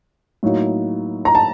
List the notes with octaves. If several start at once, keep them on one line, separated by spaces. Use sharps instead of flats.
A2 F#3 A#3 D#4
A#5
A5